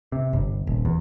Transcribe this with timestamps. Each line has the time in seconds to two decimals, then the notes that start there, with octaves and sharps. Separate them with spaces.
0.12 C3
0.33 G1
0.67 D#1
0.85 E2